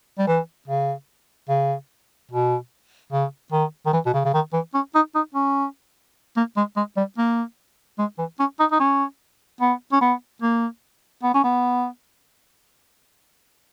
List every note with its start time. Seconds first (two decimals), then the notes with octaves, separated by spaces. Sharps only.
0.18 G3
0.27 E3
0.68 C#3
1.49 C#3
2.31 B2
3.12 C#3
3.52 D#3
3.86 D#3
3.93 E3
4.06 B2
4.14 C#3
4.25 C#3
4.34 D#3
4.53 E3
4.74 C#4
4.95 D#4
5.15 D#4
5.34 C#4
6.37 A#3
6.57 G#3
6.76 G#3
6.97 G3
7.18 A#3
7.99 G#3
8.18 E3
8.39 C#4
8.60 D#4
8.72 D#4
8.80 C#4
9.61 B3
9.92 C#4
10.01 B3
10.42 A#3
11.23 B3
11.34 C#4
11.44 B3